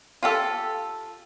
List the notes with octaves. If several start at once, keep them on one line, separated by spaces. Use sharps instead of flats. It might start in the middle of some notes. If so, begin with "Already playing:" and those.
F4 G4 A4